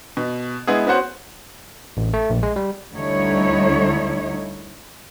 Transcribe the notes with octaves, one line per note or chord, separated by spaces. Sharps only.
B2
G#3 B3 E4 G#4
B3 C#4 F#4 C5 F#5
A1
A3
A#1
G#3
G3
D2 D3 G3 D#4 E4 C#5